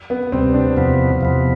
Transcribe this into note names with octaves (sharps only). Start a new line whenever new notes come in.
B3
D2 C3 G3 C4
D4
E2 C3 F3 B3
E2 C3 F3 B3